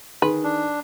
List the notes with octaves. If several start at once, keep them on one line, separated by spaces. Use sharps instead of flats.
D#3 G#4 B4
D4